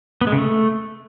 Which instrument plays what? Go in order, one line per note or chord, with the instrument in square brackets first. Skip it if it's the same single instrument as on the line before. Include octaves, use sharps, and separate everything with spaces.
[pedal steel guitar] B3
G#3
C#3
A3